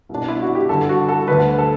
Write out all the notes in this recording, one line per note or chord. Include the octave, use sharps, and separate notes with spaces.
C2
B2 D4
E4
F#4
G4
G2 D3 A4
F#4
A4
D2 D3 B4
A4